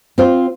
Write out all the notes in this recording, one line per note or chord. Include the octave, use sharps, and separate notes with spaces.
C4 F4 C5